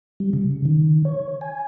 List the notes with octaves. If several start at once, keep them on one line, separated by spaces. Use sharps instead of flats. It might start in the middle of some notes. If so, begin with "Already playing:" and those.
G3
C#3
D#3
C#5
G#5